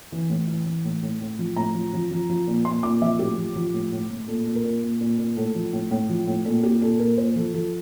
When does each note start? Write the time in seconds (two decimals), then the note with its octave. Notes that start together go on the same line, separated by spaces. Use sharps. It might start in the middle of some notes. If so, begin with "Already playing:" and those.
0.12 E3
0.30 A2
0.48 E3
0.66 E3
0.84 A2
1.02 A2
1.21 A2
1.39 F3
1.56 A2 A#5
1.75 F3
1.93 F3
2.11 F3
2.29 F3
2.47 A#2
2.65 A#2 C6
2.83 A#2 D6
3.01 F3 E5
3.19 A2 G4
3.38 F3
3.56 F3
3.74 A2
3.92 A2
4.10 A2
4.28 A#2 A4
4.46 A#2
4.55 A#4
4.64 A#2
4.83 A#2
5.01 A#2
5.18 A#2
5.36 A2 A4
5.55 F3
5.73 A2
5.91 A2
6.09 F3
6.27 A2
6.45 A#2 A4
6.63 A#2 G4
6.81 A#2 A4
6.99 A#2 A#4
7.18 A#2 C5
7.36 F3 A4
7.54 F3 A4